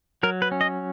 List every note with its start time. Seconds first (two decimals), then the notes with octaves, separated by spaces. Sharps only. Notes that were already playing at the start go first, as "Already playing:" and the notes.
0.23 F#3 A#4
0.42 B4
0.52 C#4
0.61 D#5